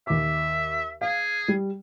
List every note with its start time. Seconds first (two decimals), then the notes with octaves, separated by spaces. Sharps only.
0.07 D#2 E5 D6
1.01 G#4 F5
1.48 G3